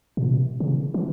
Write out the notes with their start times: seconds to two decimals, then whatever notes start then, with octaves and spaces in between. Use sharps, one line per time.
0.17 A#2
0.27 C3
0.60 C#3
0.94 E3